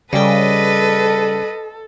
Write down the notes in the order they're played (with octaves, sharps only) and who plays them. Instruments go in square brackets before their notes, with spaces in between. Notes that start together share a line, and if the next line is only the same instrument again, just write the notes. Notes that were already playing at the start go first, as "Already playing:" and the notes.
[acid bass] C#3 [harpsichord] G3 G4 [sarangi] A4 [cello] B4 D#5